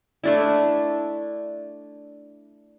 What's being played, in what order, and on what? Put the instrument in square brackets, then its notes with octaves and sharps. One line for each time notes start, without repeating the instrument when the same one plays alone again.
[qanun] A3 D4 E4